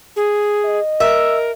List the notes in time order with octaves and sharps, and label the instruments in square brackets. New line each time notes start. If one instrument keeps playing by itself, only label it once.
[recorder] G#4
[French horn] D#5
[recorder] A#4 [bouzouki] E5